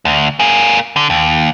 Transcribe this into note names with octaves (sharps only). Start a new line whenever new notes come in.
D2
A#3 G#4
D3
D#2